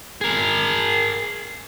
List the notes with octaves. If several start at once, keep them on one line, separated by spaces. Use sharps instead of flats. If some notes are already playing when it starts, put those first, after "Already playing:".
G#4 A#4